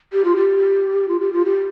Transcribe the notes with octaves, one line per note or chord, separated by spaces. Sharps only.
G4
F4
G4
F4
G4
F4
G4